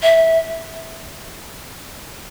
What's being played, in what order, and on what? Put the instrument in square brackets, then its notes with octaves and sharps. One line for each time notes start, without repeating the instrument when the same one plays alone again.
[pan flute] E5